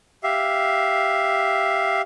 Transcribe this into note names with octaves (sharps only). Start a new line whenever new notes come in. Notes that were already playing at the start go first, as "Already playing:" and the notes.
G4 E5 F5